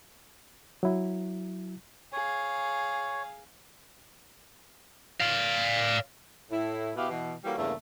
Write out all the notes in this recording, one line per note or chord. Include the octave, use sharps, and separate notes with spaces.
F#3 E4
G#4 C#5 F5
D5 F5
A2 E4
B2 B3 E4 G4 F5
B2 E3
E3 G3 A#3 C#4 F#4 A4
E2 G2 C#3 A3 A#3